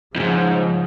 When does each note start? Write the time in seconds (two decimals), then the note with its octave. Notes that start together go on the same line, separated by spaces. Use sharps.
0.16 F2 G#2 C#3 F3